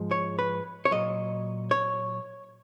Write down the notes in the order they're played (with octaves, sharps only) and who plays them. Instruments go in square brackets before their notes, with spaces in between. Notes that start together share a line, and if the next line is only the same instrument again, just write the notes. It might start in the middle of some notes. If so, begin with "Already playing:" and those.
Already playing: [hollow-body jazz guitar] G#2 F3 G#3
C#5
B4
C#5
A#2 F#3 D#5
C#5